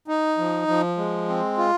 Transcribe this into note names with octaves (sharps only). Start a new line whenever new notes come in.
D#4
F3
F3
G#3
C4
F4